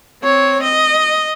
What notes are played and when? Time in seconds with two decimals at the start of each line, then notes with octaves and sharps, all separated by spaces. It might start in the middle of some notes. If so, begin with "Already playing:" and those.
0.23 C4 C#5
0.63 D#5